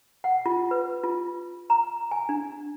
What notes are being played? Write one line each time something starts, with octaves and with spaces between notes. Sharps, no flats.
F#5
F4
B4
F4
A#5
G#5
D4